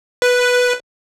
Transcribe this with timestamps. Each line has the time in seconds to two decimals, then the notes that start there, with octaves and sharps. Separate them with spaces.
0.22 B4